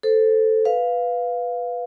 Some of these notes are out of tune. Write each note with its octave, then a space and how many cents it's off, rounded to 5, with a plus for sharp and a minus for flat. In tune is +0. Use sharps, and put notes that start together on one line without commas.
A4 +0 C5 +0
B4 +0 F5 +0